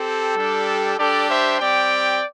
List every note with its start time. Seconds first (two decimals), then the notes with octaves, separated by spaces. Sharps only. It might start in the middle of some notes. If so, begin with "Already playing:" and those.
Already playing: C4 G4 A4
0.36 G3 D4 G4
0.97 G3 D4 G4 A4 D5
1.29 C5 E5
1.59 G3 C4 G4 D5 G5